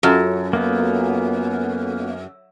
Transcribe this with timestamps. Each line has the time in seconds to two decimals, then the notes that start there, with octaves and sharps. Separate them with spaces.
0.03 F#2 F4 F#4 A4
0.53 A#3 B3